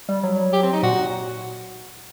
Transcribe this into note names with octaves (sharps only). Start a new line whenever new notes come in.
G3
F#3
G4
C4
D#4
A#2 F#4